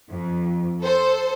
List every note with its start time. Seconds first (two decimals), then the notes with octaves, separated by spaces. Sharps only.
0.10 F2
0.83 A4 C5